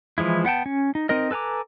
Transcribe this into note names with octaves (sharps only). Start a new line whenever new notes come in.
E3 F3 G#3 E4
B3 F#5 G5 A5
C#4
D#4
C4 D#4 A#4 D#5
A4 B4 G#5 A#5 D6